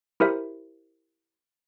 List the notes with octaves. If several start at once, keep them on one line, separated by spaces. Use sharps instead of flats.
E4 G4 A#4 C5 E5